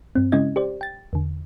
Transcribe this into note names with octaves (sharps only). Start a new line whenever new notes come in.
G2 C4
C#3 G#3 C#4 E4 D#5 G#6
G4 C5 D5
G5 A6
E2 D3